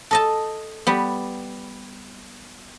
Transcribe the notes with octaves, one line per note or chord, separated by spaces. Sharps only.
A4 D#5 A5
G3 B3